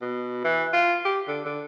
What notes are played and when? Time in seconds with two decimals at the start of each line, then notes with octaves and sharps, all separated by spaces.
0.01 B2
0.44 E3
0.73 F4
1.05 G4
1.28 D3
1.45 D3